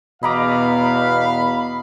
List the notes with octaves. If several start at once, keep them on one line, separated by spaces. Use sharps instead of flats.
E2 B2 D#5 F5 A#5 B5 D6